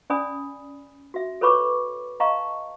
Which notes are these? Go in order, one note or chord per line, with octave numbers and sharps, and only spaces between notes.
C#4 D5 G#5 B5 D#6
F#4 E5
A4 B4 C#5 B5 C#6 D6
D#5 F5 A5 A#5 C#6